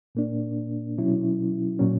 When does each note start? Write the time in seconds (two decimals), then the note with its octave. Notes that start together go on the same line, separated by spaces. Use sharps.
0.15 A#2 A#3 D4
0.98 B2 F#3 C#4 E4
1.79 A#2 F#3 C#4